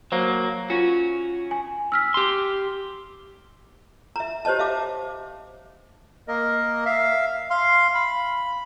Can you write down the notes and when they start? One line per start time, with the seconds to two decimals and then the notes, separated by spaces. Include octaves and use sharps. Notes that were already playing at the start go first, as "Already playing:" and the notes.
0.12 F#3 A#3 C5
0.70 C#4 F4 F#4
1.51 G#5
1.92 E6 F6 B6
2.14 G4 C6
4.16 E5 A#5
4.45 G4 C5 C#5 D#5 A5
4.59 E5 F5 D6
6.28 A#3 A#4 D#5
6.86 E5 F5
7.50 F5 C6
7.95 B5